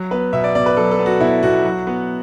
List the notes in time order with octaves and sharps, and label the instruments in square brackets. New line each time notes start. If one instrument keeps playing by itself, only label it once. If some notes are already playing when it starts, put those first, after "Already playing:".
Already playing: [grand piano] F#3
B3 B4
B2 E5
D5
B2 D5
B4
F#3 A4
A4
B3
F#4
B2 E4
B2 F#4
F#3
B3